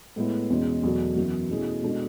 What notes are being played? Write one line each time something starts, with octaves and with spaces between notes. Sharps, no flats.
A2 G#3 B3 E4 B4
E2 B2 G#3 C#4
E2 B2 F#3 A3
F#2 E3 B3 F#4
B2 A3 C#4 E4 G#4
B2 G#3 D4 F#4 A4